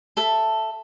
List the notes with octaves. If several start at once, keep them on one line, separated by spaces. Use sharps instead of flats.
A4 E5 A5